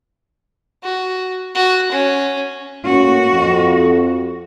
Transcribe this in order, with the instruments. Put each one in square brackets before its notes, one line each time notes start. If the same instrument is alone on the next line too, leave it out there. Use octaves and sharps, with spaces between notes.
[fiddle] F#4
F#4
C#4
[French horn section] A2 A#3 C#4 [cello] F#4
[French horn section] F2